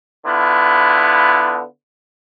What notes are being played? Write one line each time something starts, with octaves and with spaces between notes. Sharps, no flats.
D3 B3 E4 F4